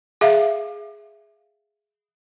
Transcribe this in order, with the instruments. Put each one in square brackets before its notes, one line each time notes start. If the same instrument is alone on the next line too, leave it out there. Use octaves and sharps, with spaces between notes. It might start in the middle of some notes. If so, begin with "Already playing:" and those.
[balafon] G#4 E5 F5